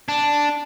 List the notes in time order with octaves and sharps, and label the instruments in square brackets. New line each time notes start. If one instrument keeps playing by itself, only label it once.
[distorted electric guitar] D4